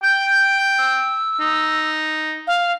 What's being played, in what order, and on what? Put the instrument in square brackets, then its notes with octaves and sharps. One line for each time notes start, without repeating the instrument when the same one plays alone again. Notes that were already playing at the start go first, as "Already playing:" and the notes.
[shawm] G5 [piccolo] G6
[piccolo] E6
[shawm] D#4
[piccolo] F5